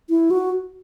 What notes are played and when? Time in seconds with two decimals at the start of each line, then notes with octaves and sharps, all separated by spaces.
0.10 E4
0.31 F#4